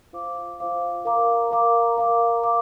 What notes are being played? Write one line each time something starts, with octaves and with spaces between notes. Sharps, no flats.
F4 C5 F5 D6
F4 C5 F5 D6
A#4 F5 A#5 D6
A#4 F5 A#5 D6
A#4 F5 A#5 D6
A#4 F5 A#5 D6